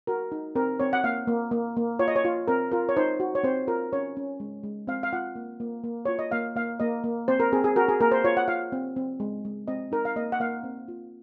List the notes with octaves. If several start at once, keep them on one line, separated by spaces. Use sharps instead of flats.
F#4 A#4
D#4
C4 A#4
C4 C#5
F#5
A#3 F5
A#3
A#3
A#3
F4 C#5
D#5
C#5
F4
C4 A#4
F4 A#4
C#5
D#4 C5
F#4
C#5
C4 C5
F4 A#4
C#4 C#5
C#4
G#3
G#3
C4 F5
F5
F4 F#5
A#3
A#3
A#3
F4 C#5
D#5
A#3 F5
A#3 F5
A#3 D#5
A#3
C4 C5
A#4
C4 G#4
G#4
F#4 A#4
G#4
A#3 A#4
C5
F4 C#5
F#5
F4 F5
C4
C4
G#3
G#3
C4 D#5
D#4 A#4
F5
A#3 D#5
F#5
A#3 F5
C4
F4